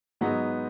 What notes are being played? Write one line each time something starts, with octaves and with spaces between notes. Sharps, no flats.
G#2 F#3 B3 D#4